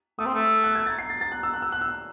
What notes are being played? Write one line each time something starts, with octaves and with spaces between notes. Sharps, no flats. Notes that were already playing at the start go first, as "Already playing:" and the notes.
A3 D#6
C4
A3
F#6
G#6
A6
C7
A6
A6
F#6
E6
F#6
E6
F#6
E6